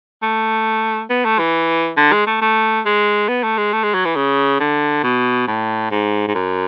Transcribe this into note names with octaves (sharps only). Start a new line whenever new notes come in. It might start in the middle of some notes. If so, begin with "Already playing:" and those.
A3
B3
A3
E3
D3
G#3
A3
A3
G#3
B3
A3
G#3
A3
G#3
F#3
E3
C#3
D3
B2
A2
G#2
G#2
F#2